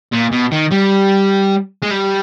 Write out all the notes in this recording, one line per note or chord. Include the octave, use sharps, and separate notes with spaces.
A#2
B2
D#3
G3
G#3
G3